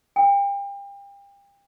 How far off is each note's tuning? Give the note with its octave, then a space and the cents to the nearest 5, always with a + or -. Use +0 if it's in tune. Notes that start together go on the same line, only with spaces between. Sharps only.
G5 +35